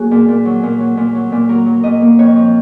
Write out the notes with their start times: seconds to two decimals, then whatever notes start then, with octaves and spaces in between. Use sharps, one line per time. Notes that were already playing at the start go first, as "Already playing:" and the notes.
Already playing: F#3 A#3 F#4 G#4
0.11 A#2
0.28 A#2
0.45 F#3
0.63 A#2
0.80 F#3
0.97 A#2
1.15 F#3
1.32 A#2
1.49 F#3 A#4
1.66 F#3
1.83 A#2 D#5
2.02 A#3
2.19 F2 C#5
2.36 F3